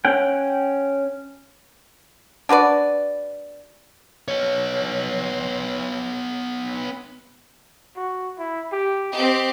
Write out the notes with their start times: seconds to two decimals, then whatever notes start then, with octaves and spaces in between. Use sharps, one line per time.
0.05 C#4 F#5 G5
2.49 D4 F#4 B4 D5
4.28 B3 C#5
7.96 F#4
8.38 E4
8.72 G4
9.13 C4 G4 D#5